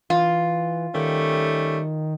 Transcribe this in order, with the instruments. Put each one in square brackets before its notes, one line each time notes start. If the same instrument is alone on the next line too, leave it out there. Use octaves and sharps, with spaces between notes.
[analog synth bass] E3 [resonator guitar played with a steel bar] F4
[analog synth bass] D#3 [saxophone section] G3 A3 C#4